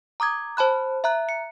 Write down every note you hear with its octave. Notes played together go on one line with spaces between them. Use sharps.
A#5 D6 D#6 G#6
C5 A5 B5 F#6
E5 A#5 F#6
C#7